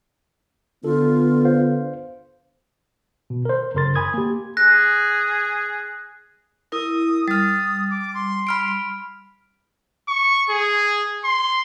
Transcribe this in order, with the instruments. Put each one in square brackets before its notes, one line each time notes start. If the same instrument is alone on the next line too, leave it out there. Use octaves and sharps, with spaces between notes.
[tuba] D3 [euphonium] B3 [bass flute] F4 [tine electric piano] A4
[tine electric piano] C5 F5
B2
A#4 C5
F#2 C#3 A#4 C6 A6
G#5 B5 C6 D#6 G#6
A#3 G4
[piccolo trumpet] G#4 [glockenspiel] F#6 A#6
[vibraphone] E4 A#4 [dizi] D#6
[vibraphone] G3 [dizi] D#6 [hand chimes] F6 A6
[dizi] D6
C6
[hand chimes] B5 F6 D7
[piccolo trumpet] C#6
G#4
C6